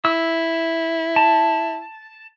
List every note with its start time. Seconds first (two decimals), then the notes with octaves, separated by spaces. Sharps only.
0.05 E4 E6
1.16 A5